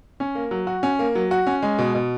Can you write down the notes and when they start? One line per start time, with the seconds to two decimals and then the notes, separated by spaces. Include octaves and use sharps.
0.20 C#4
0.35 A#3
0.51 F#3
0.67 F#4
0.83 C#4
0.99 A#3
1.15 F#3
1.31 F#4
1.47 C#4
1.62 G#3
1.78 B2
1.95 B2